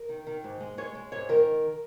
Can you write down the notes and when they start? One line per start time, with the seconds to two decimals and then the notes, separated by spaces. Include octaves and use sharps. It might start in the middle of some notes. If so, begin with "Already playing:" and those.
Already playing: A#4
0.09 D#3
0.27 D#3
0.44 G#2
0.60 G#3
0.78 G#3 C#5
0.95 G#3
1.12 G#2 C#5
1.29 D#3 A#4